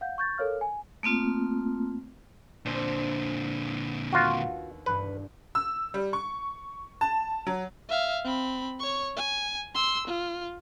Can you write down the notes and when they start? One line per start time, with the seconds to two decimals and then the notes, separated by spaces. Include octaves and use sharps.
0.01 F5 F#5 G6
0.18 C#6 G6 A6
0.38 A4 A#4 C#5 F5 F6
0.61 G#5
1.03 A3 A#3 C4 F4
2.65 A#2 D3 D4 C5
4.12 D#2 B3 F4 F#4
4.86 E1 G2 B4
5.55 E6
5.94 G3
6.13 C#6
7.01 A5
7.47 F#3
7.89 E5 F5
8.24 C4 B5
8.80 C#5 C#6
9.17 G#5
9.75 C6 E6
10.08 F4